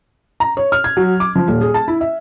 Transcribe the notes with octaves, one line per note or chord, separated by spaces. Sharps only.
A#5
C#5
F6
G#6
F#3
D6
F3
D#1
G#4
A5
E4
E5